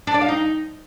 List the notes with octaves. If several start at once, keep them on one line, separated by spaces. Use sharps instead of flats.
D4
D5
F5
D#4